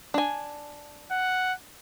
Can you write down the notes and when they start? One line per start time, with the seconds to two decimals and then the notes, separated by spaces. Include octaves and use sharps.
0.14 D4 G#5
1.11 F#5